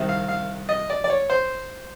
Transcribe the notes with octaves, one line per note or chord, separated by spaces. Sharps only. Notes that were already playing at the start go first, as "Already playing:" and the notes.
Already playing: C2 C3 D#3
F5
F5
D#5
D5
D5
C#5
C5